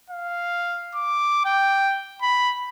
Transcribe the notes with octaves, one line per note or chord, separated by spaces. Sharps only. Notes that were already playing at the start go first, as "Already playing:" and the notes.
F5
D6
G5
B5